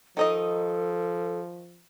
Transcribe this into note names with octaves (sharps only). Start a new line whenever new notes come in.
D#3 F3 D#4 A4 D#5